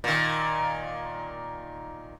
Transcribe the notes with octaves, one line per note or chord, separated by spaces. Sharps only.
A#2 D#3